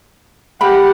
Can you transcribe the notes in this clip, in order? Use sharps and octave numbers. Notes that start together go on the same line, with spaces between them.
G4 A#4 F#5 B5